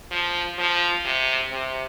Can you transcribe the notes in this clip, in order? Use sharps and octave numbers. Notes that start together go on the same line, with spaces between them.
F3
F3
C3
C3